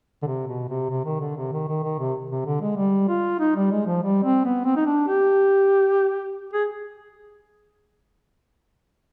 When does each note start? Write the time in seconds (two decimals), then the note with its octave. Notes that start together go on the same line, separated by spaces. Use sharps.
0.22 D3
0.27 C3
0.47 B2
0.69 C3
0.90 C3
1.05 D#3
1.20 D3
1.37 C3
1.52 D#3
1.68 D#3
1.83 D#3
1.99 C3
2.30 C3
2.46 D3
2.62 G#3
2.77 G3
3.09 F4
3.40 D#4
3.56 G3
3.71 G#3
3.87 F3
4.03 G3
4.24 C4
4.45 B3
4.65 C4
4.76 D#4
4.86 D4
5.07 G4
6.53 G#4